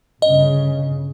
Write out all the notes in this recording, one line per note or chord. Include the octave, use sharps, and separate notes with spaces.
G1 C#3 D#5